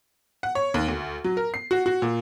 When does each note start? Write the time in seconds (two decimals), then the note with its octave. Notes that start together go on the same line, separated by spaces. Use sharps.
0.43 F#5
0.55 C#5
0.74 D#2
0.88 D2
1.24 F#3
1.37 A#4
1.54 C7
1.71 F#4
1.86 F#4
2.02 A#2